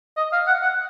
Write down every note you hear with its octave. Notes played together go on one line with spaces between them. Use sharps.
D#5
F5
F#5
F#5